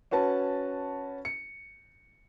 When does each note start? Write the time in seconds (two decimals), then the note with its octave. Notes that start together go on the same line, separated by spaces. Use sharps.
0.11 C#4 F#4 B4 A5
1.25 C#7